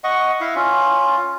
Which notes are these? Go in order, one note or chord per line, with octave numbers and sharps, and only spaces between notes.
D#5 F#5 C#6
E4 E5 F5
C#4 F4